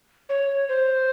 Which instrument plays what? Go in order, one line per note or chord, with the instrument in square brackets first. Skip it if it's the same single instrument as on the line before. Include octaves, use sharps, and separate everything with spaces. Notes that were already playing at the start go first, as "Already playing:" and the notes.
[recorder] C#5
C5